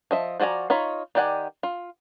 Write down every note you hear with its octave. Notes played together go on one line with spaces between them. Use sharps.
F3 D#5 E5
F3 F#4 D5 G#5 A#5
D#4 F4 C#5 B5
D#3 G4 D5 F#5 G#5
F4